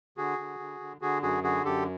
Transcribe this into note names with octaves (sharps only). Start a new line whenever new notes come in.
D3 F#4 G#4
D3
D3
D3
D3 F#4 G#4
F#2 F#4 G#4
D3 F#4 G#4
F#2 G4 A4